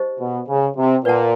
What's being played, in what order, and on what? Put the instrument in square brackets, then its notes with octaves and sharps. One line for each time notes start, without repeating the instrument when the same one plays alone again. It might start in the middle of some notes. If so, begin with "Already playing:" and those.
Already playing: [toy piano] D#4 G4 C5 D#5
[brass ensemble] B2
C#3
C3
[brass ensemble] A#2 [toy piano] B4 D5 F#5 A5